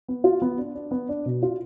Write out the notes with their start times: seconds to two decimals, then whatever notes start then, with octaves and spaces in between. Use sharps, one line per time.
0.08 B3
0.24 F4
0.42 B3
0.58 D4
0.75 D4
0.91 B3
1.09 D4
1.25 B2
1.43 F4